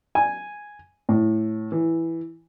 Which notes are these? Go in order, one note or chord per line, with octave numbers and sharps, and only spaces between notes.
G#5
A2
E3